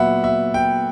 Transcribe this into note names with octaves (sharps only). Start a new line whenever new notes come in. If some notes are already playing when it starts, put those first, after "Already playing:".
Already playing: A#2 F#3 B3 E5 F#5 B5
E5
G5